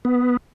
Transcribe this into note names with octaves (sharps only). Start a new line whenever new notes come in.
B3